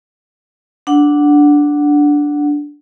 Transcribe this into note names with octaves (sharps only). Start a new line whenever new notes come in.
D4 F#5